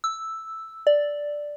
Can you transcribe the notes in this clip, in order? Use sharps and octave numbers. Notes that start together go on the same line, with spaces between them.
E6
D5